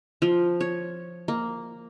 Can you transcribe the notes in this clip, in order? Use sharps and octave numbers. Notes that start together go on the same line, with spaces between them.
F3
C#5
A#3